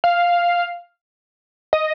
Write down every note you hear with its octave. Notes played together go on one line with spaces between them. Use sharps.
F5
D#5